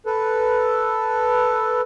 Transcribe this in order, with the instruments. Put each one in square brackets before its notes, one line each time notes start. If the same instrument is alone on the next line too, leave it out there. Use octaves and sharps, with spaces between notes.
[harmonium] A4 B4